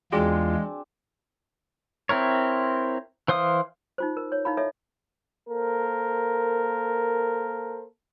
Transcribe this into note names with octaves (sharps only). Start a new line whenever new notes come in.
E2 G#3 C4 D4 F4 F#4 G#4 G#5
C4 E4 A#4 C#5
E3 C5 F5 D#6
D#4 F4 C5
A#4
C#5
D#4 E4 F5 B5
A4 C#5 D#5 E5
A#3 A4 A#4 C5